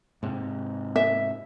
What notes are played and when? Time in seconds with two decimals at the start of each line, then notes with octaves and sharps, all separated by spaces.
0.23 G#2 C3
0.96 E5